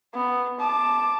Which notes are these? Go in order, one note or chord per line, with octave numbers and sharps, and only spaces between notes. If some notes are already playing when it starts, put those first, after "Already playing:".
B3
A5 D6